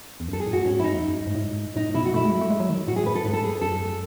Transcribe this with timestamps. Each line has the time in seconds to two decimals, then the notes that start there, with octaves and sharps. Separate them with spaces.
0.20 E2
0.28 F#2 A4
0.40 G#4
0.47 A2
0.53 F#4
0.65 G#2 C#4
0.79 E4
0.84 D#4
0.93 E2
1.03 F#2
1.14 G#2
1.27 G#2
1.35 A2
1.40 G#2
1.76 A2 D#4
1.95 B2 E4
2.05 F#4
2.14 A3 E4
2.23 G#3
2.32 F#3
2.41 A3
2.50 G#3
2.60 F#3
2.69 D#3
2.87 A2 F#4
2.96 G#4
3.06 B4
3.15 A4
3.25 G#2 B4
3.33 A4
3.44 G#4
3.61 F#2 A4